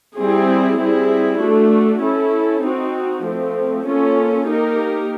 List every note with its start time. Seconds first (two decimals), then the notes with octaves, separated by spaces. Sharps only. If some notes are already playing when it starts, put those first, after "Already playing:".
0.16 G3 C4 E4 G#4
0.78 G3 C4 E4 G#4
1.40 A3 D4 F#4
2.01 C#4 E4 A4
2.62 C4 D#4 F#4
3.24 F3 A3 C4
3.85 A#3 C#4 F4 A4
4.47 A#3 D#4 G4 A#4